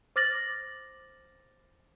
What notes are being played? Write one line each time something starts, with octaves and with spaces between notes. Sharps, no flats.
C5 D6 F6 A6 A#6 F#7